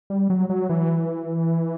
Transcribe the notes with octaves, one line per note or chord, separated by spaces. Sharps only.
G3
F#3
F#3
E3